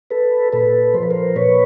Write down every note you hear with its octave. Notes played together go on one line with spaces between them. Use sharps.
A4 B4
A#2 A4 B4
F3 C5
B4
A#4 C5
A#2 B4 C#5